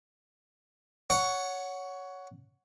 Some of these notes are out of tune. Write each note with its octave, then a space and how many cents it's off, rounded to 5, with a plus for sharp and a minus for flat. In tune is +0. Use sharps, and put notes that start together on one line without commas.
C#5 +15 F#5 +0